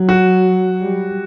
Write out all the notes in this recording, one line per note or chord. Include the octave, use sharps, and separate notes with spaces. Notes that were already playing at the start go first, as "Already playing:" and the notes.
Already playing: F#3
F#4
G3